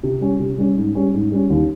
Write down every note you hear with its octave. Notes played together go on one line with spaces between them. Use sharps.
C3
G3 C#4
C3
G3 C#4
G#2
G3 C#4
G#2
G3 C#4
D#2